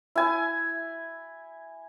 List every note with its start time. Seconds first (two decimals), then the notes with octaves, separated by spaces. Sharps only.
0.15 E4 G#5